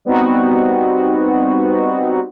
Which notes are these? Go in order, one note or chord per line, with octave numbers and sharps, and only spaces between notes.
G3 B3 C4 D#4 F#4